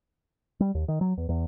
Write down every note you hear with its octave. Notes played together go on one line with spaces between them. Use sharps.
G3
D#2
D#3
F#3
E2
E2